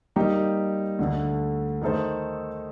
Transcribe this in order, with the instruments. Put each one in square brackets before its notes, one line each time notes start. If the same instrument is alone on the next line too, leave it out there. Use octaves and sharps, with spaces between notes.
[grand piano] G3 A#3 D#4 G4
D2 D3 A3
D#3 A3 D#4 A4 C5